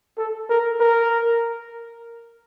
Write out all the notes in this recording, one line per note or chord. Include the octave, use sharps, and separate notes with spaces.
A4
A#4
A#4